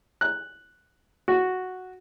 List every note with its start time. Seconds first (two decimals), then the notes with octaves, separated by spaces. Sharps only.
0.21 F#6
1.28 F#4